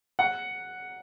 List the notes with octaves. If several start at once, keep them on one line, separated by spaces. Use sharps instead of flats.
F#5